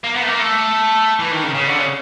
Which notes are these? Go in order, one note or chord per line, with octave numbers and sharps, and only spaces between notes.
A#3
B3
A3
A#3
A3
E3
D#3
C#3
C#3
D3
C#3